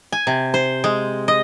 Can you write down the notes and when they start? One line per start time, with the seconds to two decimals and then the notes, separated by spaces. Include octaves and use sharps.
0.12 G#5
0.27 C3
0.54 C5
0.84 G#3
1.28 D#5